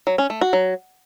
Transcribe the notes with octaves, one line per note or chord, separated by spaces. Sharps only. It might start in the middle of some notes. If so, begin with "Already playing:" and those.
F#3
C#4
A3
F#4
F#3